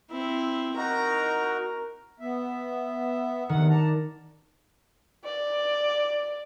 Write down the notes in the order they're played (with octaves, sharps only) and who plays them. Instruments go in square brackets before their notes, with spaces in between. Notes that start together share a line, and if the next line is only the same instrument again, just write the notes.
[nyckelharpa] C4 E4
[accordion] D#4 F#4 [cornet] A#4 [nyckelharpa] A#5
[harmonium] B3 E5
[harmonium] E2 C3 F#5 [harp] D#3
[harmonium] D5 A5 A#5
[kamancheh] D5